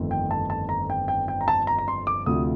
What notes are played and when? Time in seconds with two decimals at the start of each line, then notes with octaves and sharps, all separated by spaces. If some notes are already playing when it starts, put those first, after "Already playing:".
Already playing: G1 F2 D#3 A3 C4
0.11 G5
0.31 A5
0.50 A5
0.69 A#5
0.90 G5
1.08 G5
1.28 G5
1.41 A#5
1.48 A5
1.67 A#5
1.78 A#5
1.88 C6
2.07 D6
2.26 D2 C3 F3 D#6